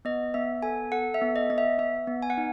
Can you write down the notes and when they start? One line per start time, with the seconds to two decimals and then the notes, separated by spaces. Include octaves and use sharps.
0.05 B3 D#5
0.34 B3 E5
0.62 A4 G#5
0.92 A4 F#5
1.14 E5
1.22 B3
1.36 D#5
1.50 B3 D#5
1.58 E5
1.79 B3 E5
2.07 B3
2.22 G#5
2.30 F#5
2.37 D#4